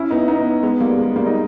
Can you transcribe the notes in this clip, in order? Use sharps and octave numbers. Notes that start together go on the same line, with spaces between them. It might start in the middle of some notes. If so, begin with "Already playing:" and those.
Already playing: C#4 E4
B3 D#4
B3 D#4
G#3 B3
G3 A#3
G#3
G3 A#3
D#4